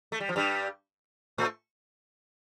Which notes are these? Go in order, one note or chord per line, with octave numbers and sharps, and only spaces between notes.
A3
G3
F3
G2 G3
A2 A3